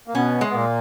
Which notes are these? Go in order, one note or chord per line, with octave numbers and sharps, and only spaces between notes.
A#3
B2 B3 C#4
G#3
B3
A#2 A#3